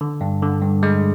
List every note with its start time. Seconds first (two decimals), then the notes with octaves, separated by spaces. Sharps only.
0.01 D3
0.21 G2
0.42 D3
0.62 G2
0.83 G#3